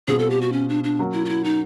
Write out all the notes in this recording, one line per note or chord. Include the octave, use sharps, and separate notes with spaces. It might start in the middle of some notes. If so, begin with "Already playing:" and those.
B2 G3 C4 F4 G#4
A4
G4
F#4
C#4
D4
D4
F#3 A#3 C#4 F#4 A#4
E4
F4
E4
D#4